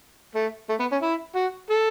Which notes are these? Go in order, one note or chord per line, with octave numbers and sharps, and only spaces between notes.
A3
A3
B3
C#4
E4
F#4
A4